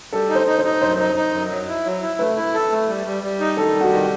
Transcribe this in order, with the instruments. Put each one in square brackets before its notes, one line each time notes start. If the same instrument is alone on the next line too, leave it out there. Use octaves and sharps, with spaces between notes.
[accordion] G3 [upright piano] A4
[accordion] D#4
[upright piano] C5
[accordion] D#4
[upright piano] C5
[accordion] D#4
[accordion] F#2 [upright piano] C5
[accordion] D#4
D#4
F#2
F#3
E4
F#3
E4
[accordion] A3 [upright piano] B4
[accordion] E4
A4
A3
G3
G3
G3
D#4
[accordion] D#3 [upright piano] A4
[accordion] G3
[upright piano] F#4
[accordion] D#3